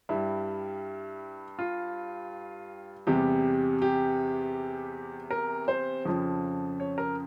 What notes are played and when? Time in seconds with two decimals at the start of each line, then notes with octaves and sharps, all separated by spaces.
0.09 G2 G3 E4
1.59 F4
3.07 E2 C3 G3 G4
3.82 G4
5.31 A#4
5.68 C5
6.05 F2 C#3 F3
6.80 C#5
6.98 A#4